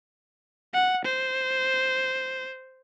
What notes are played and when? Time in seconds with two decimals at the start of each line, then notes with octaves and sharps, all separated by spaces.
0.74 F#5
1.05 C5